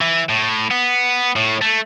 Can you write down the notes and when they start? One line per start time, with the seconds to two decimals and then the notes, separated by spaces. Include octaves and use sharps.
0.01 E3
0.29 A2
0.71 B3
1.36 A2
1.62 A3